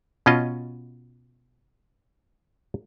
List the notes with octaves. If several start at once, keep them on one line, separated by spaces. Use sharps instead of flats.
B2 C#4 F4 D#5